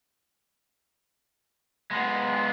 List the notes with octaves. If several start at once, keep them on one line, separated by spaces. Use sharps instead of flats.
G#3 B3